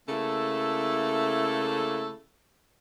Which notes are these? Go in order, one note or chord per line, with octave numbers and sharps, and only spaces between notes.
C#3 A3 A#3 E4 A4